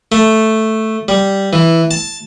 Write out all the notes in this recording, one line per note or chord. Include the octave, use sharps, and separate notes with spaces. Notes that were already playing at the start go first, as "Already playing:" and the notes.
A3
G3
E3
A5